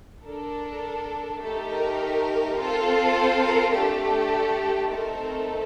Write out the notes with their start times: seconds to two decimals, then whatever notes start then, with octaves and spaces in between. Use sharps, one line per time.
0.22 D4 A4 A#4
1.39 A3 D#4 G4 A4
1.69 A#4
2.55 C4 F4 A4
3.14 C5
3.43 A#4
3.72 A3 D4 G4 A4
4.88 A3 C4 D#4 A4 A#4